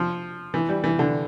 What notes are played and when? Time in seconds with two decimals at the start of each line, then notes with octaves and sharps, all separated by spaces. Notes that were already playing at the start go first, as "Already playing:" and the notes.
Already playing: F3
0.54 E3
0.69 G3
0.84 E3
0.99 D3